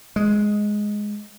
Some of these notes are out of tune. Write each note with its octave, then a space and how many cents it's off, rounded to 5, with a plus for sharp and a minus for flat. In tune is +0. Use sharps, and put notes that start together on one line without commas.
G#3 +5